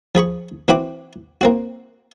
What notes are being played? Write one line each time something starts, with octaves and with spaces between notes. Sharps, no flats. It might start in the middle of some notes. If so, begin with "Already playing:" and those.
F3 G#4 B5 C#6
E3 C4 F#4 G5 B5 D6
A#3 C4 F#4